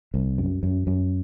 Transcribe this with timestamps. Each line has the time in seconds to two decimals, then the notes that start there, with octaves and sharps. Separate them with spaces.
0.14 C2
0.38 F#2
0.63 F#2
0.87 F#2